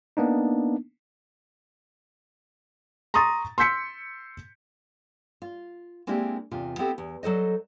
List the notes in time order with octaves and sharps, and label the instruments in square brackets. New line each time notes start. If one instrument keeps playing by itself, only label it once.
[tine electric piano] A#3 B3 D4 D#4
[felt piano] A#5 C6 C#6 D#6 A6
C6 E6 G6 B6 C#7
[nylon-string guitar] F4
G#3 A#3 C4 D4 E4 G4
E2 C3 F4
B3 C4 E4 G4 A4
E2
F#3 A4 C5 D#5